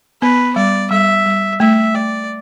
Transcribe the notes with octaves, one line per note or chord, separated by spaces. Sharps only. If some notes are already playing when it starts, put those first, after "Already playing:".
B3 B4
G3 D5
G3 E5
G3
A3 E5
A3 D5